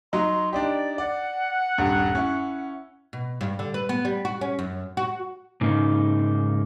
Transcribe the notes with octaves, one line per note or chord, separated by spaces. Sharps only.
F#3 D#4 C6
D4 D#4 G4 D5
D5 F#5
D#1 G2
C#4 E4
B2
G2
D3
B4
B3
G3
F#4
C#4
F#2
F#4
G#2 C#3 A#3 D#4